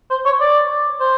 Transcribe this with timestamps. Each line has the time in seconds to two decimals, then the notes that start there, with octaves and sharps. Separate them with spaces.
0.10 C5
0.26 C#5
0.40 D5
1.00 C5